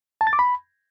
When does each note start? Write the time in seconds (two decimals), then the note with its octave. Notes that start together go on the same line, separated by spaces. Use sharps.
0.21 A5
0.27 A6
0.33 D6
0.39 B5